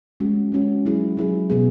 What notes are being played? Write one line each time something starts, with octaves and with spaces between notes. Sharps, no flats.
G#3 C#4 F#4
G#3 C#4 F#4
F#3 E4 G#4
F#3 E4 G#4
B2 B3 G#4